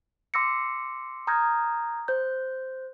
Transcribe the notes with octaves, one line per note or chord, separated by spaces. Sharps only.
C6 D6 E6 A#6 C7 C#7
A#5 D#6 F6 G6 G#6 A#6
C5 G6